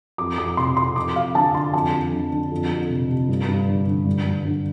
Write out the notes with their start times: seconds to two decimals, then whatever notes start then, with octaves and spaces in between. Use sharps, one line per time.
0.18 F2 D6
0.37 F2 D6
0.57 C3 C6
0.77 C3 C6
0.96 F2 D6
1.16 F2 F5
1.35 D3 A5
1.55 D3 C6
1.73 F2 A5
1.93 F2
2.13 D3
2.32 D3
2.52 F2
2.70 F2
2.90 C3
3.10 C3
3.29 G2
3.48 G2
3.68 D3
3.87 D3
4.06 G2
4.25 G2
4.45 D3